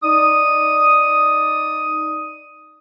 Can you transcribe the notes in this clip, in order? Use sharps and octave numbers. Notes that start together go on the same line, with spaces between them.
D#4 D5 D#6